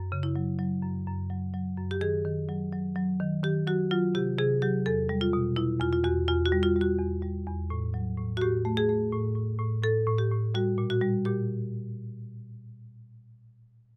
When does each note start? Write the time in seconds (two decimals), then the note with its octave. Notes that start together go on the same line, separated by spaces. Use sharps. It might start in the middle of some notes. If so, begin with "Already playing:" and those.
Already playing: F#2
0.12 C#3
0.23 E4
0.36 F#3
0.59 F#3
0.83 F#2
1.07 F#2
1.30 F#3
1.54 F#3
1.77 F#2
1.91 G4
2.01 D#3 G#4
2.25 D#3
2.49 F#3
2.72 F#3
2.96 F#3
3.20 D#3
3.43 D#3 G4
3.67 F#3 F#4
3.91 F#3 F4
4.15 C3 G4
4.38 C3 G#4
4.62 F#3 G4
4.86 E2 A4
5.09 G3
5.21 F4
5.33 B2
5.56 B2 E4
5.80 E2 F4
5.93 F4
6.04 E2 F#4
6.28 E2 F4
6.46 F#4
6.52 G3
6.63 F4
6.76 G3
6.81 F#4
6.99 E2
7.22 G3
7.47 E2
7.70 A2
7.94 F#3
8.18 A2
8.37 F#4
8.41 A2 G4
8.65 A3
8.77 G#4
8.89 A3
9.12 A2
9.36 A2
9.59 A2
9.83 A2 A4
10.07 A2
10.18 G4
10.31 A2
10.55 G3 F#4
10.78 A#2
10.90 F#4
11.02 G3
11.25 A#2 G4